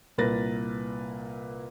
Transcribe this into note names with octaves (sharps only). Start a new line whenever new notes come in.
C2 A#2 A#3 B4 A6 A#6